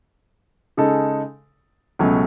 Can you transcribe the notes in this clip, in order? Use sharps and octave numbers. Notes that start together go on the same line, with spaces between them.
C#3 G#3 D#4 A4
C#2 B2 F#3 A3 C#4